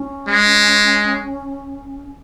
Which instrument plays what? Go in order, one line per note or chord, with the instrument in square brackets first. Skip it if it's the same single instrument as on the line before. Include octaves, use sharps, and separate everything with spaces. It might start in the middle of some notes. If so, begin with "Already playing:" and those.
Already playing: [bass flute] C#4
[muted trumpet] G#3